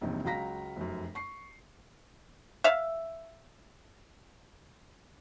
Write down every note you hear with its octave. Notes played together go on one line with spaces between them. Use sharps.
E1 A#1 G2 C3 D#4
C#2 F#3 F5 A#5 A#6 B6
F1 F#2
C#6 C7
E5 F5